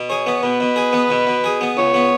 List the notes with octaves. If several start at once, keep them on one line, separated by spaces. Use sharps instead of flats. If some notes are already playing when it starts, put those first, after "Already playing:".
Already playing: B2
G#4 C#5
B3
B2 B4
B2
G#4
B3
B2
B2
G#4
B3
C#2 C#5
B3